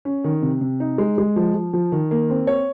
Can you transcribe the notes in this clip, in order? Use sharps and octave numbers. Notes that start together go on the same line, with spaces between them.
C#4
D#3
C3
C3
D#4
G#3
G#3
F3
F3
F3
D#3
A#3
C4
C#5